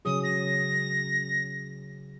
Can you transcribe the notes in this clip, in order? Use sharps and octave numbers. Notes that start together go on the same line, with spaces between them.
C#3 F#3 G#4 D#6
A#6